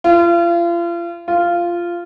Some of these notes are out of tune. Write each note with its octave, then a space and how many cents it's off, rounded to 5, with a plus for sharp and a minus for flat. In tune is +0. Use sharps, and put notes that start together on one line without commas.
F4 -35
F4 -10